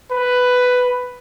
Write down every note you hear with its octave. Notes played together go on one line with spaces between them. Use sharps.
B4